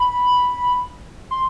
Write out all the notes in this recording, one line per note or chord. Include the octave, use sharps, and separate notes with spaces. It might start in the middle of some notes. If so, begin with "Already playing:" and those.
Already playing: B5
C6